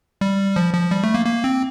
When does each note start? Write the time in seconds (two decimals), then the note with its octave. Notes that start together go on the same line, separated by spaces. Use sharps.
0.21 G3
0.56 F3
0.74 F3
0.91 G3
1.04 A3
1.14 A#3
1.26 A#3
1.44 C4